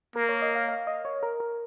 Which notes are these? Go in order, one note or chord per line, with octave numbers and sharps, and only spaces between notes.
A#3 A#4
C#5
D#5
F5
F5
D#5
C#5
A#4
A#4